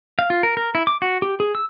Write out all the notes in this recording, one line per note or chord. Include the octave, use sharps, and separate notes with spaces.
F5
F4
A#4
A#4
E4
D6
F#4
G4
G#4
E6